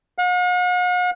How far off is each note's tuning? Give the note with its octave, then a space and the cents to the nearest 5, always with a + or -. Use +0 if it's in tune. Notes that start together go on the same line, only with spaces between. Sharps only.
F#5 -45